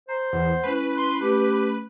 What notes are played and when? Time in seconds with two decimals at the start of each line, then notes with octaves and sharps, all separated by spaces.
0.09 C5 A#5
0.33 E2 F#5
0.64 G#3 C#4 E4 B4
0.97 C6
1.21 A3 C#4 G4